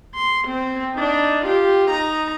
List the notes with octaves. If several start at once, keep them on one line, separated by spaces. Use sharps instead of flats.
C6
C4
D4 D#4
F4 G4
D#4 A#5